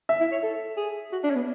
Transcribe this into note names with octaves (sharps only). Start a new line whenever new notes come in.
E5
E4
C#5
A4
G#4
F#4
D4
C#4
B3